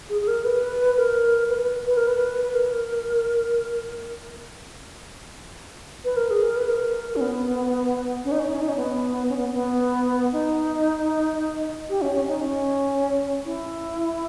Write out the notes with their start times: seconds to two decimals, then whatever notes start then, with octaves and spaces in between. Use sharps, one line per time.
0.09 G#4
0.21 G#4
0.28 A#4
0.44 B4
0.97 A#4
1.49 B4
1.55 A#4
1.61 B4
1.87 B4
1.97 A#4
2.07 B4
2.53 A#4
6.05 B4
6.17 A#4
6.30 G#4
6.43 A#4
6.56 B4
6.69 A#4
7.16 C#4
7.21 B3
8.25 C#4
8.32 D#4
8.40 C#4
8.47 D#4
8.54 C#4
8.62 D#4
8.68 C#4
8.77 B3
9.29 C#4
9.37 B3
9.53 B3
10.32 D#4
11.89 G4
12.02 C#4
12.15 C#4
12.28 D#4
12.41 C#4
13.45 E4